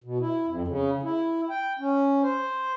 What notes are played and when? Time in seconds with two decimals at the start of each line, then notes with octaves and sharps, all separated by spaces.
0.04 B2
0.20 E4
0.47 F2
0.68 C#3
1.03 E4
1.50 G5
1.79 C#4
2.22 C5